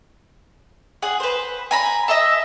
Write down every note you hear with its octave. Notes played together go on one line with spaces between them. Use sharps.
G#4 F#5
B4 C5
G#5 A#5 B5
D#5 E5 A5